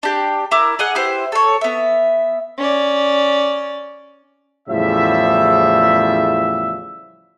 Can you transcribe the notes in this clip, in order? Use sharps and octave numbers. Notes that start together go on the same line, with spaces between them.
D4 G4
E4 A#4 D6
G#4 D#5 F#5
E4 G4 B4 C5
A4 C#5
B3 E5
C#4 D5
E2 A2 C#3 F3 G3 E5